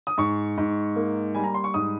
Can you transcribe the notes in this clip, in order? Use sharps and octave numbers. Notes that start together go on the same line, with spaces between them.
D#6
G#2 C#6
G#2
A#3
G3 G#5
A#5
C6
C#6
G#2 D#6